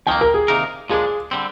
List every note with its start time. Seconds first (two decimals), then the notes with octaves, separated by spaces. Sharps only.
0.07 F2 D#3 A#3 G5
0.21 A#4
0.34 G#4
0.48 C3 D#3 A#3 D#4 A#4
0.90 A#2 F3 G#3 D4 G#4
1.31 D3 G3 C4